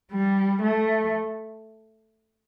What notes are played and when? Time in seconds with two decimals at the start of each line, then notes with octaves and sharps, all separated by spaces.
0.12 G3
0.62 A3